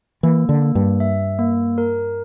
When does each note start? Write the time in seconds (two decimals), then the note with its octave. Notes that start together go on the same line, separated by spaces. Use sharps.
0.23 E3 A#3
0.49 D3
0.62 A#3
0.75 G2
1.00 E5
1.39 A#3
1.78 A#4